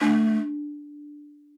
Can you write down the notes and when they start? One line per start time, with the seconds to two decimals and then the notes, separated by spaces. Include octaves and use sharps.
0.01 A3 D4